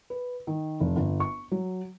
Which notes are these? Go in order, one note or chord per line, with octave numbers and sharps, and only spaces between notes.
B4
D#3
F1
G1
C#6
F#3